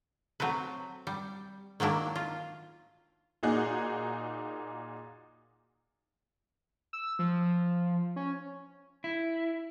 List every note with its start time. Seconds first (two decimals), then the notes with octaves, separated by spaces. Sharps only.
0.40 F#3 A3 C4 B4
1.07 G3
1.80 D#3 F#3 A#3 D4 E4
2.16 F4
3.43 A#2 A#3 D#4 F#4 G#4 F#6
6.93 E6
7.19 F3
8.16 C#4
9.04 E4